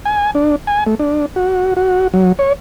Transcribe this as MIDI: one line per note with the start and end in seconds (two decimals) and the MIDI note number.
0.05 0.31 80
0.35 0.56 62
0.67 0.84 80
0.87 0.95 57
0.99 1.26 62
1.36 1.74 66
1.76 2.08 66
2.14 2.32 54
2.39 2.53 73